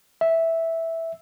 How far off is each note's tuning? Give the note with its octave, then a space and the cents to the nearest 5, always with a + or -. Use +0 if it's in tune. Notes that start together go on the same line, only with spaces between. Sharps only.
E5 -5